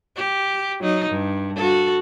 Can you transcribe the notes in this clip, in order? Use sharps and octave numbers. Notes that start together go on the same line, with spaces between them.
G4
F#3 D#4
G2
F#4 A4